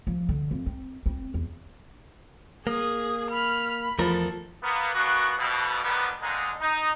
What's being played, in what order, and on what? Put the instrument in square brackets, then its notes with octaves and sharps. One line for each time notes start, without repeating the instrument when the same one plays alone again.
[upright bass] F3
D3
F2
C4
C4
E2
[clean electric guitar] A#3 [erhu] G#4 [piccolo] D#6
[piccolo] B5 [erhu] F6
[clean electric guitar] E2 A3 A#4 [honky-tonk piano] F3 [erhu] A4
[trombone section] A#3 B3
A#3 B3 C#4 D4 F#4
F2 B2
D3 D#3 F3 G3 B3
D#2 D3 G#3 D#4
D#4